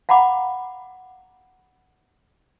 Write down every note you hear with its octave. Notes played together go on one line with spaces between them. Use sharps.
F5 F#5 A#5 B5 D6